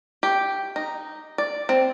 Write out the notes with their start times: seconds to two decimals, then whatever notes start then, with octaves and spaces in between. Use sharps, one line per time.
0.23 G4
0.76 D#4
1.38 D5
1.69 C4